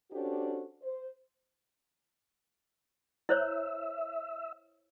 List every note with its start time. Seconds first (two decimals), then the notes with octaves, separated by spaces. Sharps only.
0.11 C#4 D4 F#4 G4 A4 C5
0.82 C5
3.29 E4 C5 C#5 E5